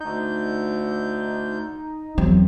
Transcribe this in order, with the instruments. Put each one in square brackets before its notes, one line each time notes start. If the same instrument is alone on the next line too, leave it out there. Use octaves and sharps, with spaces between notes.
[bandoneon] D2 G6 [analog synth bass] D#4
[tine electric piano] E2 C4 [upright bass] F#3